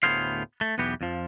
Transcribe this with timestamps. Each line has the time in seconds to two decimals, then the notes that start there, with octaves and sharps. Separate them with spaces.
0.03 D2 A2 B3 G#4 C5 F5
0.61 A3
0.78 B1 E2 E3 B3 G4
1.01 F2 F3